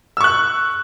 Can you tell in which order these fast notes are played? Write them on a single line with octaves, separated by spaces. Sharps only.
E6 C#6 F#6